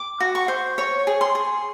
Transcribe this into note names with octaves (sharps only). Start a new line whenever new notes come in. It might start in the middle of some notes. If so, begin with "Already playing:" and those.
Already playing: D6
F#4
C#6
C5
C#5 C#6
G#4
C6
G#4